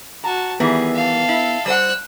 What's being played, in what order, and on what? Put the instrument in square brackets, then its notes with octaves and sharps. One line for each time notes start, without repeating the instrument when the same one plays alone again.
[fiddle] F#4 A5 [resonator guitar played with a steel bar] A#5
[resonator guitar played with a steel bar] D#3 E3 G3 [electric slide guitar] B3 [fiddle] G#4
[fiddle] A4 F5
[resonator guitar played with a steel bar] E4
[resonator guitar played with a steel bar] G3 C5 F#5 [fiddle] E6 F#6